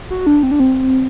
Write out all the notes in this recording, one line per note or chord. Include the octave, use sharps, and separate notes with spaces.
F#4
D4
C4
D4
C4